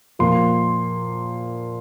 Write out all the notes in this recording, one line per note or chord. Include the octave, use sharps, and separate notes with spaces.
A#2 F3 A#3 C6